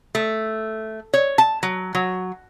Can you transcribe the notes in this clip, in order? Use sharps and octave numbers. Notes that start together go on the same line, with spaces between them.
A3
C#5
A5
F#3
F#3